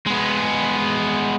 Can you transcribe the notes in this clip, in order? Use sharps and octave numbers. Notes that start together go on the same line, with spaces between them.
G#3 B3